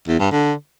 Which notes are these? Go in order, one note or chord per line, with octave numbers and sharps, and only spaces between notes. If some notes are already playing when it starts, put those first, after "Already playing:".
E2
G2
D3